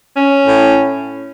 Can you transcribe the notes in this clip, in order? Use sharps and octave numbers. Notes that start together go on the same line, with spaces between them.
C#4
A2